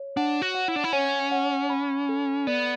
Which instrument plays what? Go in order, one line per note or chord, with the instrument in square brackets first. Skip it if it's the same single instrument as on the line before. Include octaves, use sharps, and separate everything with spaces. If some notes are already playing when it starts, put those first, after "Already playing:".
Already playing: [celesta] C#5
[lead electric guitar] D4 [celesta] F#5
[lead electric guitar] F#4
[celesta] F#5
[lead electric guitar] E4
D4
E4
[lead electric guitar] C#4 [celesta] C#5
[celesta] F#5
B5
A4
[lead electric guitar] B3 [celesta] D5